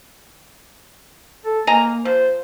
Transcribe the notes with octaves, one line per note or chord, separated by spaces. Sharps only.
A4
A#3 D#5 G#5 A#5
F3 C5